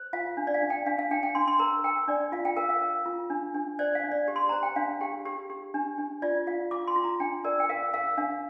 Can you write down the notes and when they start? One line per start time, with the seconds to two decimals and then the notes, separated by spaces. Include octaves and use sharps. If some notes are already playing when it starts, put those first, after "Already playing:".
Already playing: C5
0.13 F4 F5
0.37 D4
0.47 D5
0.54 F5
0.62 D4
0.70 G5
0.86 D4 F5
0.99 F5
1.11 D4 G5
1.23 G5
1.35 D4 C6
1.48 C6
1.59 A#4 A#5
1.84 A#4 G5
2.08 D4 D5
2.32 F4 F5
2.45 G5
2.56 A#4 F5
2.69 F5
2.81 A#4
3.06 F4
3.30 D4
3.54 D4
3.79 C5 D5
3.95 F5
4.03 D4
4.12 D5
4.28 G4
4.36 C6
4.49 C5 A#5
4.63 G5
4.76 D4 F5
5.01 G4 G5
5.25 G4
5.50 G4
5.74 D4
5.98 D4
6.22 F4 D5
6.47 F4 F5
6.71 F4 D6
6.87 C6
6.96 F4
7.04 A#5
7.20 D4 G5
7.44 A#4 D5
7.60 G5
7.69 A#4 F5
7.94 A#4 F5
8.17 D4 F5